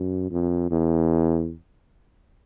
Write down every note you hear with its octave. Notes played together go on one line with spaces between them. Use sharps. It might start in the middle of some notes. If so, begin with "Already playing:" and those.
Already playing: F#2
F2
E2